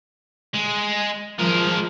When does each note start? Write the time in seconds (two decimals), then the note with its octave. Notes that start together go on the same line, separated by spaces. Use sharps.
0.54 G#3
1.39 F3 G#3 A#4